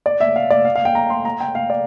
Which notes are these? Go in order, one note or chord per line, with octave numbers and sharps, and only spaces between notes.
D5
E5
F5
D5
F5
F5
G5
A#5
C6
A#5
G5
F5
D5